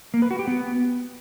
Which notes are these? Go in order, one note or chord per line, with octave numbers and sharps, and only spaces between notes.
A#3
B4
F#4
G4
B3